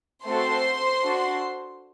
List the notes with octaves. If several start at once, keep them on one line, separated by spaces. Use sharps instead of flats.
A3 C4 F#4 A4 C5 C6
D4 F#4 A4